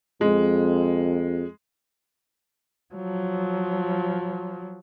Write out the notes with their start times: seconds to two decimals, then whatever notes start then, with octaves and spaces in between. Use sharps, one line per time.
0.21 F2 G#3
2.94 F3 F#3